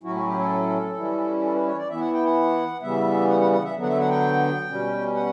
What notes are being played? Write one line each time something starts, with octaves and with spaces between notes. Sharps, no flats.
A2 F#3 C#4 E4 F#4
F#4
G4
A4
E3 G3 C#4 E4
A4
B4
C#5
D5
E3 B3 E4 E5
F#5
G5
F#5
C#3 E3 G3 B3 E5
F#5
F#5
F#5
E5
D3 F#3 B3
F#5
E5
F#5
G5
B2 G3 C#4
F#5